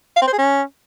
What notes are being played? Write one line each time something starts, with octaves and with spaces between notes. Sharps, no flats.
F5
C4
C5
G#4
C#4